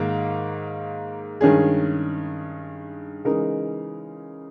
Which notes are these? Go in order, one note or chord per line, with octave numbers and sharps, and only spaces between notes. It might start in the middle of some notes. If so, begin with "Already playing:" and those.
Already playing: G#2 D#3 A#3
G2 D#3 G#3 C#4 G#4
C#3 E3 G#3 D#4 A#4